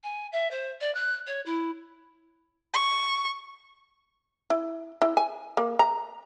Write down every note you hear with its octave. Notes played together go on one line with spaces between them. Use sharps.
G#5
E5
C5
D5
F#6
C#5
E4
C#6
E4
E4
G#5
A#3
A#5